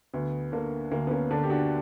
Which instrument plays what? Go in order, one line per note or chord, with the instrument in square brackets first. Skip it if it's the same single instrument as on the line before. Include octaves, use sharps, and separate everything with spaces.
[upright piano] D2 B3
D3 A#3
D2 A#3
B3
A#3 C#4
D3 B3 D4
G4
D4 F#4